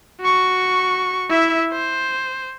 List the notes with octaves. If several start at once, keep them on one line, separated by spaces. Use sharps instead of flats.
F#4 C#6
E4 E5
C5